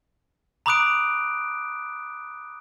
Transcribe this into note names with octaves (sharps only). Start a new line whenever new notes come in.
A#5 B5 D6 D#6 F#6 D7